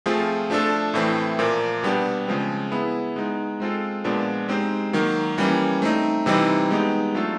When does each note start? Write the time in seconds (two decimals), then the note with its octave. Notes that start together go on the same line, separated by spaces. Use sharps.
0.06 F3 A3 C4 F4 G#4
0.50 F3 A3 D4 F4 A4
0.94 A2 E3 A3 C4
1.39 A#2 F3 A#3
1.83 B2 G3 B3 D4 G4
2.27 C#3 F3 G#3 C4
2.72 B3 E4 G#4
3.16 G#3 B3 D#4
3.60 G#3 C4 F4 A4
4.04 A#2 F3 G#3 B3 D4
4.49 G#3 C4 D#4 G4 C5
4.93 D#3 F#3 A#3
5.38 E3 G3 A#3 C#4
5.82 A3 C4 D#4
6.26 C3 E3 G3 C4 D#4
6.70 G#3 B3 D#4 G4
7.14 F#3 A3 D4 F4 A4